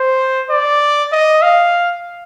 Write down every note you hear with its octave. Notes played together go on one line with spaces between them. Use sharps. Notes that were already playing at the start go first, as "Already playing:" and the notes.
Already playing: C5
D5
D#5
F5